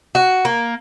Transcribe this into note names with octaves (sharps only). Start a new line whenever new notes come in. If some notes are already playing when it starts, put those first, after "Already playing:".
F#4
A#3